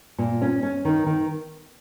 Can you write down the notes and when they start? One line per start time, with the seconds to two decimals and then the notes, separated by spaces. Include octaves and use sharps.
0.18 A#2
0.42 C#4
0.63 C#4
0.85 D#3
1.06 D#3